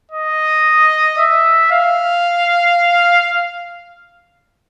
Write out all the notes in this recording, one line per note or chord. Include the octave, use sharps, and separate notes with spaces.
D#5
E5
F5